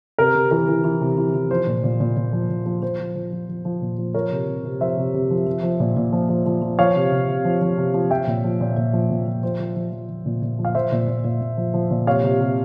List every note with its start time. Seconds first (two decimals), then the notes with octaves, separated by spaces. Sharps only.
0.18 C3 A#4
0.35 C3
0.51 E3 A#4
0.68 E3
0.84 E3
1.01 C3
1.18 E3
1.34 E3
1.50 F3 C5
1.67 A#2
1.84 A#2
2.00 A#2
2.17 A#2
2.33 F3
2.49 A#2
2.66 F3
2.82 F3 C5
2.99 F3
3.15 F3
3.32 F3
3.49 F3
3.65 F3
3.82 A#2
3.98 F3
4.14 F3 A#4 C#5
4.31 C3
4.47 C3
4.64 C3
4.81 F3 C5 E5
4.97 C3
5.14 C3
5.31 F3
5.47 F3
5.63 F3
5.80 A#2
5.97 A#2
6.13 F3
6.29 F3
6.46 F3
6.62 F3
6.79 F3 C#5 F5
6.95 C3
7.12 C3
7.28 C3
7.45 F3
7.61 F3
7.78 C3
7.94 F3
8.11 F3 E5 G5
8.27 A#2
8.44 F3
8.60 A#2
8.77 A#2
8.93 F3
9.10 A#2
9.26 F3
9.43 F3 C5
9.59 F3
9.76 F3
9.92 F3
10.09 F3
10.26 A#2
10.42 A#2
10.59 F3
10.65 F5
10.75 F3 C5 E5
10.92 A#2
11.08 A#2
11.24 A#2
11.41 A#2
11.57 F3
11.74 F3
11.91 A#2
12.07 C3 C#5 F5
12.24 C3
12.40 C3